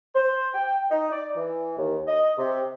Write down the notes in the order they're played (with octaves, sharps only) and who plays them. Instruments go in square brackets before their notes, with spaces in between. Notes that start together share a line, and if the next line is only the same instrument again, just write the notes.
[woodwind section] C5
G5
D#4
D5
E3
D#2
D#5
C3